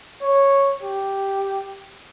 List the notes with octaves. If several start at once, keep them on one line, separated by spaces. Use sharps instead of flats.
C#5
G4